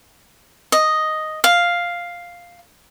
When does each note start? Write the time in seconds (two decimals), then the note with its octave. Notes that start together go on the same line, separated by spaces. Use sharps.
0.72 D#5
1.44 F5